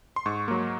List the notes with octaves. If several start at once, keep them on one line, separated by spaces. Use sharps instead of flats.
C6
G#2 C#6
F#3 A#3